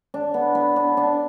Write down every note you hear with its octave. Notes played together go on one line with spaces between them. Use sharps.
D4
B3
B3
D4
D4